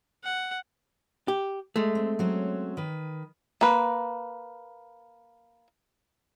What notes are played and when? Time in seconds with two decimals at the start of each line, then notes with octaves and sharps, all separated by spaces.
0.24 F#5
1.28 G4
1.76 G#3 A3
1.95 C4
2.19 F#3 C4 C#4
2.77 D#3 B4
3.61 A#3 B4